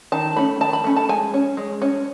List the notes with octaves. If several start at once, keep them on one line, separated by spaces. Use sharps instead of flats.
D#3 A5
A3 C#4 B5
D#3 A5
B5
A3 C#4
A5
G#3 G#5
C#4
G#3
C#4